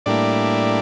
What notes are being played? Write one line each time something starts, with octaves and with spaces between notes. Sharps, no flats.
A2 G3 A#3 D4 E4 D5